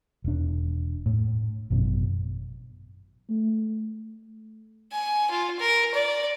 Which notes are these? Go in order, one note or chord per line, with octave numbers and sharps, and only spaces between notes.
E1 D4
A2
G#1 F#2 B2 F#3
A3
G#5
F4
A#4
D5